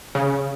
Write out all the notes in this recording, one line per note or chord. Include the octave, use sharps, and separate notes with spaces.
C#3